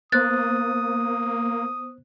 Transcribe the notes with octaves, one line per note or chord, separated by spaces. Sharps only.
A#3 B3 C5 D#6 F#6 A6